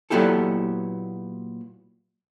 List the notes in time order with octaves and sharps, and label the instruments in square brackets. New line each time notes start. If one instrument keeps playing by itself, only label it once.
[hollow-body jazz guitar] A#2 F#3 B3 E4 G4 A4